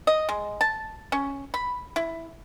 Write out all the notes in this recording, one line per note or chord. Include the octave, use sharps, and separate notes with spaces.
D#5
G#3
A5
C#4
B5
E4